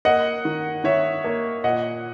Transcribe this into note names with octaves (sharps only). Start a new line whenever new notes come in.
A#3 D#5 F#5
D#3
D#3 C#5 E5
A#3
A#2 D#5 F#5